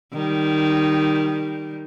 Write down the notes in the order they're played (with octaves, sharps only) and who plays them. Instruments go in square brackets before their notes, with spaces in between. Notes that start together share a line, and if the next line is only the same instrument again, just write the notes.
[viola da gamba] D#3 G3